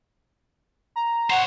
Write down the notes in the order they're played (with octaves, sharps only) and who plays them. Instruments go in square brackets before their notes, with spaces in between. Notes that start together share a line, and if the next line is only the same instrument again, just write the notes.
[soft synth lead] A#5
[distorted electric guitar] C5 C#5 [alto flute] F#5